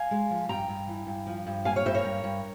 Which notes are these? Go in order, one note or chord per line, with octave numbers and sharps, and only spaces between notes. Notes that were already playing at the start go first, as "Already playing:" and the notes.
Already playing: F5 G#5
G#3
F3
G2 G5 A#5
G2
E3
G2
F3
G2
A#3 F5 G#5
C#5 F5
G2 C5 E5
A#4 C#5
G2
G2